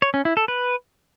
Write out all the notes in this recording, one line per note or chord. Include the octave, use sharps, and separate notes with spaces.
C#5
C#4
E4
A4
B4